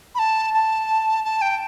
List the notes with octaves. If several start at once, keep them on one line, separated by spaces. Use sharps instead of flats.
B5
A5
A5
A5
G5